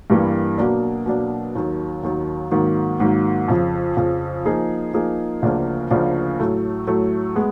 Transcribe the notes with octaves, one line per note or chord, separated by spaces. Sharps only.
G2 E3 G3 A#3
B2 F#3 A#3 D4
B2 F#3 A#3 D4
D#2 D#3 F#3
D#2 D#3 F#3
G#2 D#3 F#3 A#3
G#2 D#3 F#3 A#3
F2 C#3 F3
F2 C#3 F3
F3 A#3 D#4 G#4
F3 A#3 D#4 G#4
D2 C#3 F3 A#3 D4
D2 C#3 F3 A#3 D4
A2 F#3 A3
A2 F#3 A3
G#3 B3